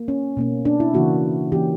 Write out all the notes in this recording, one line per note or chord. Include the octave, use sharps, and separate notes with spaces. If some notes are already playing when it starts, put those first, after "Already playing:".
Already playing: A#3
C#4
B2 A#3 C#4
D4
E4
C#3 E3 A#3 F#4
E3 A#3 C#4 G4